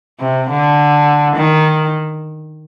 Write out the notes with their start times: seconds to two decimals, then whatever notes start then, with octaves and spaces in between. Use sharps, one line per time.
0.20 C3
0.49 D3
1.36 D#3